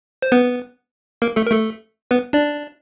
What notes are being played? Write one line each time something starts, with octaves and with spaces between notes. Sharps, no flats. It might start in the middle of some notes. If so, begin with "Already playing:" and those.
C5
B3 B4
A#3 A#4
A3 A4
A#4
A3 A4
B3 B4
D4 D5